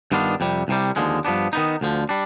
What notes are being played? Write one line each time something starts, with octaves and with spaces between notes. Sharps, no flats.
G2 D#3 B3 D4 F4
F2 C3 G3
C2 C3 G3
D#2 D3 F3 G#3
G2 F3 B3 D4
D#3 B3 D#4
D2 D3 F3
G3 D4